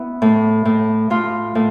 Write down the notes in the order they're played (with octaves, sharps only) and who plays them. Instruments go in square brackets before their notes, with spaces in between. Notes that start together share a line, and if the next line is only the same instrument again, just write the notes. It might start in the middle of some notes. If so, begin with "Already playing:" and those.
Already playing: [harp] B3 E4
A2
A2
A2 F4
A2